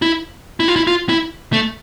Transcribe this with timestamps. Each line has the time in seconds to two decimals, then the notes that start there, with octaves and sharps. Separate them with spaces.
0.02 E4
0.60 E4
0.68 F4
0.76 E4
0.87 F4
1.09 E4
1.53 A3